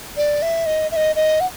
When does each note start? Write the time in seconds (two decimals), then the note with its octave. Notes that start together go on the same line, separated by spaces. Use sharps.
0.17 D5
0.42 E5
0.66 D#5
0.91 E5
0.96 D#5
1.16 D#5
1.40 F#5